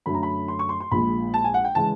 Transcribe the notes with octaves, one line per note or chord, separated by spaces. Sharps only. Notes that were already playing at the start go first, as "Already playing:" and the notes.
F#2 D3 F#3 A3 B5
A#5
B5
C6
C#6
C6
C6
A#1 A#2 F3 G#3 B5
A5
G#5
F#5
G5
C#3 E3 G#3 A5